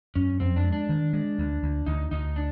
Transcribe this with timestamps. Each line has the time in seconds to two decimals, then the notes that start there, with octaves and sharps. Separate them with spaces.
0.15 F#2 C#4
0.40 F2 C4
0.56 D4
0.65 G#3
0.72 D4
0.89 D#3
1.13 G#3
1.38 D2
1.63 D2
1.86 D2 D#4
2.11 D2 D#4
2.36 D4